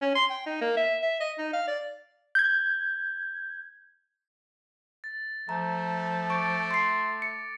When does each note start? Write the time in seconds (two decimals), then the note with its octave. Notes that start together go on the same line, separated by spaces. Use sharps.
0.02 C#4
0.15 C6
0.30 G5
0.46 D#4
0.61 A#3
0.77 E5
1.02 E5
1.20 D#5
1.38 D#4
1.53 F5
1.68 D5
2.35 G6 G#6
5.04 A6
5.49 F3 A3 A#5
6.30 C#6 D6 A6 D7
6.71 C6 A6 C7
7.22 C#7